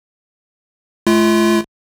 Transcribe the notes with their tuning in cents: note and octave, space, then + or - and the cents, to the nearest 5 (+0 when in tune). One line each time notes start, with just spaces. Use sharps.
A3 -40 F4 -35